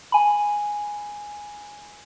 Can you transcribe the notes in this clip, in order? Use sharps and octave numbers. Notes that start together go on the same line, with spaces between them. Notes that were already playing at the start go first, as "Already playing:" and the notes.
G#5 B5